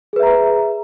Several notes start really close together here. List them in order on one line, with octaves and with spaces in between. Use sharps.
G#4 B4 E5 A#5